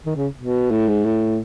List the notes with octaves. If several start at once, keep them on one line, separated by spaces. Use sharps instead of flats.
D#3
C#3
B2
A2
G#2
A2